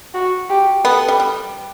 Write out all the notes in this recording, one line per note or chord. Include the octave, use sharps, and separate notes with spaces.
F#4
G4
B3 A4
G3
G3